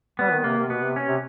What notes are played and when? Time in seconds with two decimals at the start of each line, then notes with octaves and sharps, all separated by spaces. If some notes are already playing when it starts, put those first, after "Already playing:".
0.19 G3 B3
0.32 D#3
0.44 C3 A#3
0.58 C3
0.70 B2 B3
0.82 C3
0.96 C#4
1.08 C3